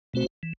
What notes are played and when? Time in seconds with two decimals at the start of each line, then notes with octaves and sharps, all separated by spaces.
0.14 B2 A3 C4 F#4 C5
0.43 E3